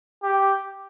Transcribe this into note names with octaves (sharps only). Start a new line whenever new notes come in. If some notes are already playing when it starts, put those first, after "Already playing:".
G4